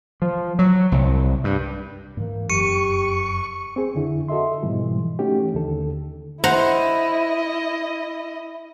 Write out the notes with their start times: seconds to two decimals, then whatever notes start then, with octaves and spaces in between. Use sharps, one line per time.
0.22 F3
0.59 F#3
0.92 C2
1.44 G2
2.17 G#2 E3 A#3
2.50 F1 F#2 G4 C#6 C#7 D#7
3.76 C4 G#4
3.95 F2 D3 E4
4.28 F#4 A4 D#5 E5 C6
4.63 G#2 B2 E3 F3 G3
5.19 E3 A3 C#4 D#4 F#4 G4
5.54 D#2 D3 A4
6.44 E4 C5 D#5 F#5 A#5